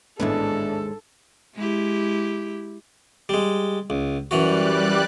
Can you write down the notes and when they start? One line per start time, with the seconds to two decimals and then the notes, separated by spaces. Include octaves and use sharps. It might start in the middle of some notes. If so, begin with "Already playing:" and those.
0.20 A1 D#2 G#2 G#3 B3 D4 A4
1.54 G#3 E4 G4
3.29 G3 G#3
3.90 C#2
4.31 F#2 E3 G3 F#4 D5 F#6